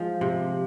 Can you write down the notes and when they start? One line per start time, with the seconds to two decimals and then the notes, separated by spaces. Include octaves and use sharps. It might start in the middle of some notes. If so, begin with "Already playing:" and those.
Already playing: F3 G#3
0.21 C3